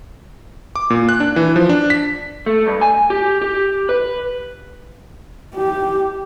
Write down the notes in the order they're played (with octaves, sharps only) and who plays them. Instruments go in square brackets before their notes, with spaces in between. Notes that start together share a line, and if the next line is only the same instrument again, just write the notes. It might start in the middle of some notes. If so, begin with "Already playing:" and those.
[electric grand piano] D6
A#2
F#6
D4
E3
F3
D4
B6
[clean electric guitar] A3
G2
G#5
G4
G4
B4
[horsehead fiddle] G4